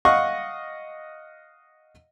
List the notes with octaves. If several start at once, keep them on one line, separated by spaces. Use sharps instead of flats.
D#5 F5 F#5 C#6